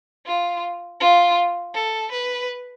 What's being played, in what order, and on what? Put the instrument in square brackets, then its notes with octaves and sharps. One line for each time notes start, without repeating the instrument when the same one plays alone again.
[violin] F4
F4
A4
B4